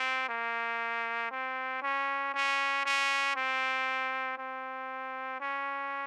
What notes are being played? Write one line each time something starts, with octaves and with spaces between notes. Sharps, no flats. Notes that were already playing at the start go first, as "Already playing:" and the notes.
Already playing: C4
A#3
C4
C#4
C#4
C#4
C4
C4
C#4